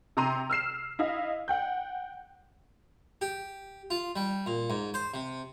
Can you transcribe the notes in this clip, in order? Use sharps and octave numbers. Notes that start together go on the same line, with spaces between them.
C3 A#5 C6 D#7
E6 F6 C7 E7
E4 D#5 F5
F#5 G5 G6
G4
F4
G3
A#2
G#2
C5
C3